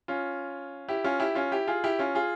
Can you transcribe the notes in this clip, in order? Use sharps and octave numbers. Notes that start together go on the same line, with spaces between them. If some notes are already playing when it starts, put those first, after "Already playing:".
C#4 F4
E4 G4
C#4 F4
E4 G4
C#4 F4
E4 G4
F4 G#4
E4 G4
C#4 F4
F4 G#4